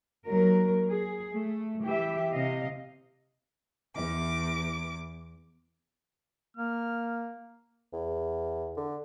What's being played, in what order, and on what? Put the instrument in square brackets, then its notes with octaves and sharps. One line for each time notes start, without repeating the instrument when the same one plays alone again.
[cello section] D#2 F#3 A#4
G#4
A3
E3 G4 E5
C3 D#5 F5
[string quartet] E2 D6
[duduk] A#3 [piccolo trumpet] F6
[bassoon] E2
D3